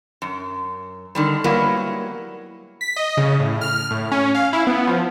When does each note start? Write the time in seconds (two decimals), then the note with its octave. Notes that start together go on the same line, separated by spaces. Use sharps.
0.22 F#2
1.15 D3 D#3 G3
1.44 F#3 G3 A#3 B3 E4
2.81 B6
2.96 D#5
3.17 C#3
3.40 A2
3.61 F6
3.91 A2
4.11 C#4
4.34 F5
4.53 E4
4.67 B3
4.87 F3